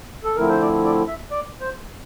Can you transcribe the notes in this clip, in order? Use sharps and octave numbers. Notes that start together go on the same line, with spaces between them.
A4
D3 F3 A3 C4 E4 A#4
C5
D5
D5
E5
D5
C5